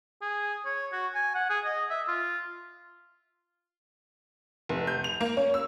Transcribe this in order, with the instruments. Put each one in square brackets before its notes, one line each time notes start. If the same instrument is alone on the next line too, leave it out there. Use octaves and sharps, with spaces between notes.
[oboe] G#4
C#5
F#4
G#5
F#5
G#4
D#5
E5
F4
[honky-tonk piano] F1
G6
F7
A#3
C#4
E6